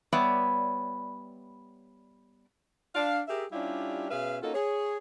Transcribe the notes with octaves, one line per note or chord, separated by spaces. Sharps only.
G3 B3 C#5 D5 E5
D4 F5
G4 G#4 A#4 E5
G3 C#4 D4 E4 F4 G4
B2 C#4 G#4 B4 E5 F5
A#3 C#4 D#4 F4 F#4 A4
G#4 C#5